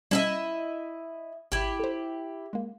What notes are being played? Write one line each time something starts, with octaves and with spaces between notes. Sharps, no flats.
G3 C#4 E4 D#5 E5
G#1 E4 G4
A4 C5
G#3 A#3